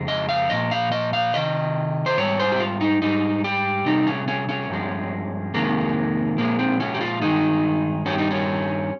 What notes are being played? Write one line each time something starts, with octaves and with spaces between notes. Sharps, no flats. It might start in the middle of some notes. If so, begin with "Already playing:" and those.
Already playing: F2 C#3 G#3
D#5
F5
A#2 F3 D#5
F5
D#5
F5
C3 D#3 D#5
C5
G#2 G3 C#5
C5
G4
F4
D#4
G#2 G3 D#4
G4
C3 G3 D#4
C#4
C#4
C#4
G2 F3 G#3
F2 C3 D#3 G#3 A#3
A#2 F3 G#3 A#3
C4
C#4
G4
F4
G2 D#3 G#3 D#4
G2 D#3 G3 C#4
D#4
C#4